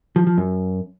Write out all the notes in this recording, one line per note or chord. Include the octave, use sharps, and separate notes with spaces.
F3
F3
F#2